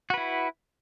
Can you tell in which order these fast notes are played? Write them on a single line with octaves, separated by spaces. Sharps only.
F#4 B4 E4